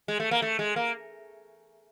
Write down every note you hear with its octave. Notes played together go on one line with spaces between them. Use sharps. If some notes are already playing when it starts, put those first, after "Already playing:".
G#3
A3
A#3
A3
G#3
A#3